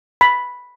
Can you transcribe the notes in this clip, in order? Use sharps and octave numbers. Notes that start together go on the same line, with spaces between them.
B5